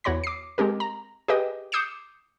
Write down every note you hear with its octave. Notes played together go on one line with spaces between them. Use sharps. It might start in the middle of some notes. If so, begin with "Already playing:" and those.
E2 F#4 C#5 B5 A#6
D6 C7
G#3 C4 G4 A#4
A#5
G4 G#4 B4 D#5 D#6
D6 D#6 G6 C7 C#7 E7